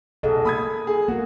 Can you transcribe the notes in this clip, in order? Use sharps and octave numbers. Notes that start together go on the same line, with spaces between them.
B1 G#4 A4 D#5
A#3 B5 D#6 G#6
G#4
A#3 F#4 A#4